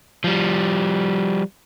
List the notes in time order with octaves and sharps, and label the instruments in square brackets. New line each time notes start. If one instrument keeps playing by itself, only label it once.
[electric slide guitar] F3 G3